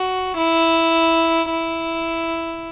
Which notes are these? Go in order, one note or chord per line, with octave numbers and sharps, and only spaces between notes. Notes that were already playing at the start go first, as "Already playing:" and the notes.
Already playing: F#4
E4
E4